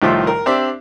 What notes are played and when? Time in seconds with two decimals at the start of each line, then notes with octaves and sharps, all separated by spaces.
0.02 C2 A2 D#3 F3 F4 E5
0.27 A#4
0.46 C4 D4 G4 D5 E5